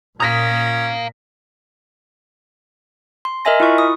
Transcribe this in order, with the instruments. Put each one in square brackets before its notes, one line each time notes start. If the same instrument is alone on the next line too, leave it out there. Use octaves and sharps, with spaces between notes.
[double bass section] A#2 [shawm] C#4 [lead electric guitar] F5 A#5 [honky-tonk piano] D#6 A#6 B6
[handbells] C6
A#4 D#5 E5 G#5 A#6
E4 F4 C#6
D#6